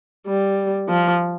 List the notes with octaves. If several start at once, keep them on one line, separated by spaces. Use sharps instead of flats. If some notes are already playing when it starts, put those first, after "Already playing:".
G3
F3